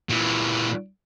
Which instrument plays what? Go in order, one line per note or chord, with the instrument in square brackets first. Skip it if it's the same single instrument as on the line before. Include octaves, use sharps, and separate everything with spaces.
[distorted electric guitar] A#2 E3